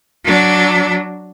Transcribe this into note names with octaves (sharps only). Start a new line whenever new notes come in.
F#3 D4